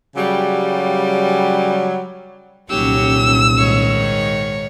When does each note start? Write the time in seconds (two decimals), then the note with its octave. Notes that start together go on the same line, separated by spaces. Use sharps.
0.15 C#3 F#3 G3
2.70 D#1 C2 A#2 F#3 C#4 G4 E6
3.57 G#2 D#3 C#5